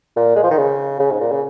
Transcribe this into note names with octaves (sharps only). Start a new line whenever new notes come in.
A#2
G#3
F3
D#3
C#3
C#3
G#2
A#2
C#3